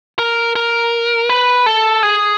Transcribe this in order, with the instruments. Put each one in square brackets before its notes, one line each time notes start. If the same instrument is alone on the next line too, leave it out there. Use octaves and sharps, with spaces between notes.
[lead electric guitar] A#4
A#4
B4
A4
G#4